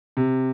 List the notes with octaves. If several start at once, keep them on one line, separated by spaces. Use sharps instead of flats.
C3